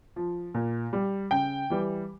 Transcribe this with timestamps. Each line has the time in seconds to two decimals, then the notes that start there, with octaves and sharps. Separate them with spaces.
0.16 F3
0.54 A#2
0.93 G3
1.31 C#3 G5
1.70 E3 G3